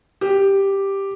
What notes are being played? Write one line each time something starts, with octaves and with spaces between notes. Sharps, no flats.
G4